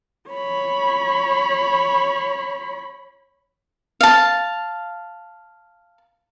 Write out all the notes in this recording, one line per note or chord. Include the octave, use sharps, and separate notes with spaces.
C#5 B5
F5 A5